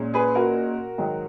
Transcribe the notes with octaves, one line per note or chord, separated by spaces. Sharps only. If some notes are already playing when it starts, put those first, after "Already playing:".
Already playing: A#2 G#3 C#4
G#4 B4
F#4 A#4
G#2 D#3 F#3